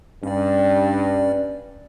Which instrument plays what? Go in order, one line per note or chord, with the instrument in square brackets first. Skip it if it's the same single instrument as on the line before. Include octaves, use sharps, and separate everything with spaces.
[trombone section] G2 [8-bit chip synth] C#4 D5